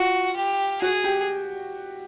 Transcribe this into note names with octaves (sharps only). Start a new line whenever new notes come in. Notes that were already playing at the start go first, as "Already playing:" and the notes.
Already playing: F4 F#4
G4
F#4 G#4
G4